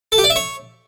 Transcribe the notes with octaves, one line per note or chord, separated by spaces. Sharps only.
A4
G4
D5
E5
C#5